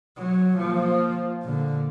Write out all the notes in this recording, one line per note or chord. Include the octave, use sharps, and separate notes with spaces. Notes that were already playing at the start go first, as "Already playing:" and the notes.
F#3
F3 A#3
A#2 D3